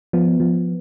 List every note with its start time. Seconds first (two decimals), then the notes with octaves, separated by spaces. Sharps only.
0.13 F3 B3
0.40 F3